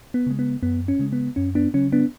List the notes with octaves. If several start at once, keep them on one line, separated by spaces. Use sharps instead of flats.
B3
C#3 G#3
B3
F#2 B3
C#4
C#3 G#3
B3
F#2 C#4
B3 D4
C#3 F#3 C#4
B3 D4